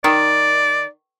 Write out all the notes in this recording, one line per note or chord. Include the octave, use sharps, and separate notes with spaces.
D#3 D5